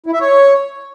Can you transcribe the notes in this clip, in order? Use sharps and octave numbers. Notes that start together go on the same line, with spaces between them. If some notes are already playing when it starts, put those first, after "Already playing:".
E4
E5
C#5